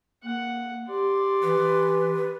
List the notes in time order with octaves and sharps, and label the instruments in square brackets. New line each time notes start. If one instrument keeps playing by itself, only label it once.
[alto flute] A#3 [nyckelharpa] F#5
[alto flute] G4 [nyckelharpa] D5 C6
[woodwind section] E3 [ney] B4